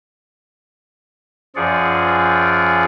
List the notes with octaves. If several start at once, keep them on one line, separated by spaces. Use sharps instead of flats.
F#2 F3 F4 G#4 D5 F#5